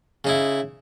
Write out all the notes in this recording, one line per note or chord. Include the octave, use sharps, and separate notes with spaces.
C#3 D#4 E4